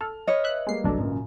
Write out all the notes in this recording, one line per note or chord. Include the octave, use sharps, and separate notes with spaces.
A4 F6
B4 C#5 D#5
E5 F#6
G3 G#3 A#3 C7
G1 C2 F#3 D4 A4
G#1 F#2 A#2 C#3